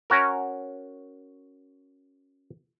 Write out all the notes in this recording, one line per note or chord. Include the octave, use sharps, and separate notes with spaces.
C#4 F#4 A#4